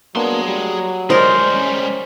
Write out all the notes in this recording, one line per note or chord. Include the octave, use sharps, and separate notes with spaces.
F#3 A#3 B3 D4 G#4 C6
G3
G3 G#3 A#4 C5 D5 D#5
C#4